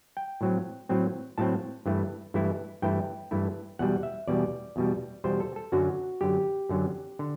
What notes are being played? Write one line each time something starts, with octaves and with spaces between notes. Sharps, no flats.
G5
A2 F#3 C4
A2 F#3 C4
A2 F#3 C4 A5
G2 E3 A3 E4
G2 E3 A3 E4
G2 E3 A3 E4 G5
G2 E3 A3 E4
E2 B2 G3 F#5
E5
E2 B2 G3 D5
E2 B2 G3
E2 B2 G3 C5
A4
A4
F#2 D3 F#3 F#4
F#2 D3 F#3 G4
F#2 D3 F#3
D3